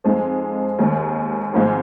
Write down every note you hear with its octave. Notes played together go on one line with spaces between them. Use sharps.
F2 F3 G#3 D#4
D#2 D#3 G#3
G#1 G#2 F3 G#3